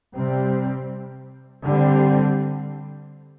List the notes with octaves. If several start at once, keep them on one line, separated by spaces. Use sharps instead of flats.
C3 G3 C4
D3 G3 C4